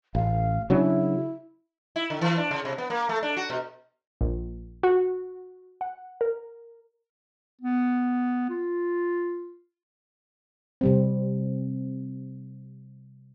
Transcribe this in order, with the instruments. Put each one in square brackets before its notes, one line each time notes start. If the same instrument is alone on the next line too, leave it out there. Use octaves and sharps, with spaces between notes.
[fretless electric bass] A1 [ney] F5
[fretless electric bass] C#3 F#3 D4 [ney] E4
[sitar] E4
D3
E3
D4
C#3
C3
B3
A#3
A3
D4
F#4
B2
[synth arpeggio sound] A#1
F#4
F#5
A#4
[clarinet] B3
F4
[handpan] C3 G3 C4